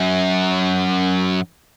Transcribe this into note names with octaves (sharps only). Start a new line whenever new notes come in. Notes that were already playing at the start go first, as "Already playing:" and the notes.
Already playing: F#2